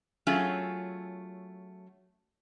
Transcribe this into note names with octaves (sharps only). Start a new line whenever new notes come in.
F#3 A3 C#4 F4 G#4